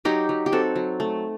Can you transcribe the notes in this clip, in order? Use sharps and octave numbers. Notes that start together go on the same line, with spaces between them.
F#3 D#4 G4
F#3
G4
C4 F#4 A4
F#3
A3